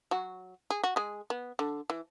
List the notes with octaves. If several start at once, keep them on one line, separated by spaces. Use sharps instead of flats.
F#3 F#4
G#4
F#4
G#3 G#4
B3
D3
E3